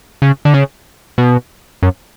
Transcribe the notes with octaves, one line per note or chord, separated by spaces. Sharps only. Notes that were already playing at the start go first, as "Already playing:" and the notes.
C#3
D3
C#3
B2
F#2